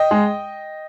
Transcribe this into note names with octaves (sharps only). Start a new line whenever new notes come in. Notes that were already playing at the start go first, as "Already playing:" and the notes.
Already playing: D#5 G5
G#3